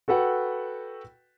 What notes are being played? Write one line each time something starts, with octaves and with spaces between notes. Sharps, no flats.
F#4 A4 B4 F#5 G5